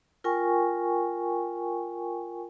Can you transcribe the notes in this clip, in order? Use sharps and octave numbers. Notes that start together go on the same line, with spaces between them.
F4 A#4 G5 G#5 C#6